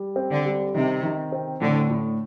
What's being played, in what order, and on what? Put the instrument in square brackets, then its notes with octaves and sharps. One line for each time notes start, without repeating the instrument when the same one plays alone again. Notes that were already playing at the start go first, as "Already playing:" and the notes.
Already playing: [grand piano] G3
C4
[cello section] D3
[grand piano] G3
[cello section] C3 [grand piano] D#3
[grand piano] D#3
C4
[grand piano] A2 [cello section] D3
[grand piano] A2